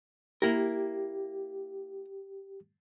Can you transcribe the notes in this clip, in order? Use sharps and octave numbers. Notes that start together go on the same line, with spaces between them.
A#3 E4 G4 A#4